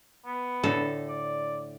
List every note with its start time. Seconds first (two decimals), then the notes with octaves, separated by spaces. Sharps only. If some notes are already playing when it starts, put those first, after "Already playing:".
0.25 B3
0.64 A2 D3 A4
1.09 D5